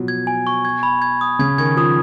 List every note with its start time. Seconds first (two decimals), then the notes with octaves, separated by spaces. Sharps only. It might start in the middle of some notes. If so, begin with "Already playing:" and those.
Already playing: B2 F3 F#3
0.08 G#6
0.27 G#5
0.47 C#6
0.65 G#6
0.83 B5
1.02 G#6
1.21 D#6
1.39 C#3 G#6
1.58 D#3 G#6
1.77 F3 D#6